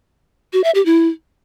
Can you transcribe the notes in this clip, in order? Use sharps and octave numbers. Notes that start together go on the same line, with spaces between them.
F#4
E5
G4
E4